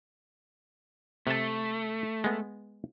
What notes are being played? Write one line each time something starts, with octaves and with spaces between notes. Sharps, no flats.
C3 A3 A5
G#3 B3